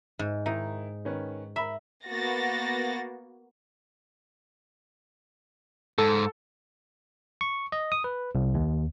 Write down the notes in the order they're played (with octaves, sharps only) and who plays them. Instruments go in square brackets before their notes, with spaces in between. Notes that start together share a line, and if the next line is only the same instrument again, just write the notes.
[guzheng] G#2
[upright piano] D#3 E4 [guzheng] D#4
[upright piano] D#3 C#4 B4
[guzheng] E5 [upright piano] A#5 B5
[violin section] A#3 B3 F#4 A6 A#6
[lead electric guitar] G#2 [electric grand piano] A4
[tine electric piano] C#6
D#5
D#6
B4
C2
D#2